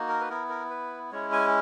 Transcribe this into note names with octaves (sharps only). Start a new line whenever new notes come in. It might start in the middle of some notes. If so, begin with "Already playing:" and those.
Already playing: A#3 D#4 F#4
A#4
B4
B3 E4 A#4
A#4
B4
G#3 C#4 E4 C#5
G#5